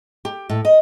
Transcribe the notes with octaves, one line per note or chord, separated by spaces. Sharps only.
G4
A2
D#5